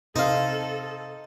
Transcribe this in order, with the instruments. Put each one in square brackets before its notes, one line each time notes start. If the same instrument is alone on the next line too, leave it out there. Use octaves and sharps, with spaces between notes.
[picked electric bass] C3 [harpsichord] D#4 [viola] A4 [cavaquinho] C5 F5